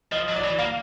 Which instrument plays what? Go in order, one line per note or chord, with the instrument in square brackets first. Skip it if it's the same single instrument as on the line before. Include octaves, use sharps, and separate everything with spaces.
[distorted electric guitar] F3 [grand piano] D#5
[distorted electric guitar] F#3
[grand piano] D5
[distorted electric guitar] E3
[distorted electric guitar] A#3 [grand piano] F5